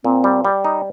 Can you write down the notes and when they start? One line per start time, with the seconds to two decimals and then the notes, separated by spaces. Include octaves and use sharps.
0.04 A#2 C4
0.24 G3
0.45 G3
0.65 D#4